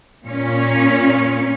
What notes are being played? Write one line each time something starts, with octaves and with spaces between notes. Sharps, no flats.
A#2 C#4